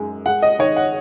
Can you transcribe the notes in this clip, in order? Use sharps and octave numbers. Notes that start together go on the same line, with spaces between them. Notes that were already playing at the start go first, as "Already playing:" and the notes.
Already playing: F#2 G#3 D#4
G#3 F#5
D#5
D#3 C#5
F#5